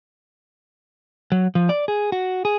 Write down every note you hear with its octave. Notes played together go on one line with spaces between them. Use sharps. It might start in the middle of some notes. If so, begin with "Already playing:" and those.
F#3
F3
D5
G#4
F#4
G#4